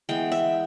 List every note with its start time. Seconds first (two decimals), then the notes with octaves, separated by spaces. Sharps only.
0.09 E3 G#3 B3 G5
0.32 E5